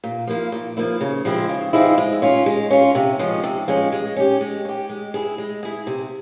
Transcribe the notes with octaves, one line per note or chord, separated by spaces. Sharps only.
A#2
F3 A#3 E4
A#2
F3 A#3 E4
C#3
F3 G#3 C4 E4
C#3
F3 G#3 C4 E4
G#3
C#4 F4
G#3
C#4 F4
C3
F3 G#3 C#4
C3
F3 G#3 C#4
G#3
C#4 G4
G#3
C#4 G4
G#3
E4 G#4
G#3
E4 G#4
C3